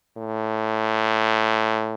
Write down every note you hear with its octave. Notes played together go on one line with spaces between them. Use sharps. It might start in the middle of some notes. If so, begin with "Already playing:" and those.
A2